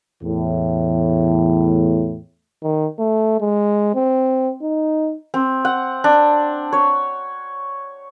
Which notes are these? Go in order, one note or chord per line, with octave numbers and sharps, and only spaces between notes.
E2 A2
D#3
A3
G#3
C4
D#4
C4
F#5
D4
C#5